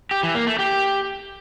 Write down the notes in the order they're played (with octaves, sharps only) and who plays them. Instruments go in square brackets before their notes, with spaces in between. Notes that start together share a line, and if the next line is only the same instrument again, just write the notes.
[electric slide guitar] G4
E3
A#3
A3
G4